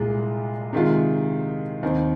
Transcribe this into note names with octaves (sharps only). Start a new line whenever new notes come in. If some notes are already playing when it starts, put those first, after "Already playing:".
Already playing: C2 A#2 G#3 F4
C3 D#3 G#3 F4
D#2 D#3 C4